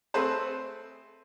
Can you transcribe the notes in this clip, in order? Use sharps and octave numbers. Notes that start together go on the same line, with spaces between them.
A3 C4 G#4 A4 B4 C5